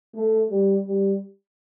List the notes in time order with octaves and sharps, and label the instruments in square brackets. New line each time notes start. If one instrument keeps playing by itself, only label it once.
[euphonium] A3
G3
G3